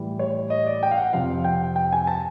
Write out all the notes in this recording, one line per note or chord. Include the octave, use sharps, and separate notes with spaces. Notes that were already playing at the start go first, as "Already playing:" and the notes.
Already playing: A2 E3 G3
C#5
D#5
D5
G5
F5
F#5
F2 C3 F3 F5
G5
G5
G#5
A5